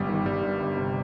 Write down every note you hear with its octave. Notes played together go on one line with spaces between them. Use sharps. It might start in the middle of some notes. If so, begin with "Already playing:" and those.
Already playing: G1 G2 G3
D#3
G1 G3
G2
G1
C3